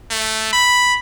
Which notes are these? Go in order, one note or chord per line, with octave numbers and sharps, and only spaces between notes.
A3
B5